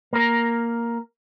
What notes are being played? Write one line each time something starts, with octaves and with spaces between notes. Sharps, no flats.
A#3 A#4